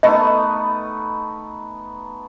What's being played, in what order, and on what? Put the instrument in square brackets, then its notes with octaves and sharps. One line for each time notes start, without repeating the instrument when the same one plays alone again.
[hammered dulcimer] A3 B3 D#4 [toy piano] D#5